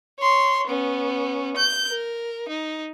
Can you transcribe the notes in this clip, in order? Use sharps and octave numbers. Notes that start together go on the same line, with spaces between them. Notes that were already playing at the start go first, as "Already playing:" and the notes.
C#5 C6
B3 C#4
G6
A#4
D#4